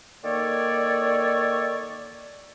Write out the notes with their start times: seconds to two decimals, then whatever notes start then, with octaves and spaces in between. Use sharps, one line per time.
0.24 D#3 A#3 A4 C#5 D5